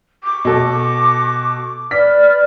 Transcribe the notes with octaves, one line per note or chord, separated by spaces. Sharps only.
C#6 D6
B2 A4
B4 D5 F6 B6